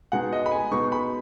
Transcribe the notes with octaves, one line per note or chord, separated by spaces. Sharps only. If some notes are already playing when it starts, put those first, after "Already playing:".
B2 G#3 B3 D#4 F#5
D#5
B5
G#5
B2 G#3 B3 D#4 C#6
B5